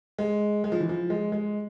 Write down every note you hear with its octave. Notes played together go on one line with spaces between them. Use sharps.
G#3
G#3
F3
E3
F3
G#3
G#3